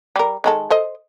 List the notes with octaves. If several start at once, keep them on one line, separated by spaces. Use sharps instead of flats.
G3 A#4
D#3 G#3 A4
A4 C5 D#5